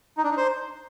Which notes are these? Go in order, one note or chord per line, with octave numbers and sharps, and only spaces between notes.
D#4
D4
D#4
C5